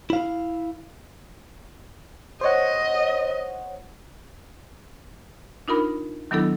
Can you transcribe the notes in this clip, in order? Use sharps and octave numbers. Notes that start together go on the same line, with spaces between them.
E4 F5
C5 C#5 D#5 F#5
D4 D#4 F4 A#4 B5
D#3 F#3 B3 D4 E4 A4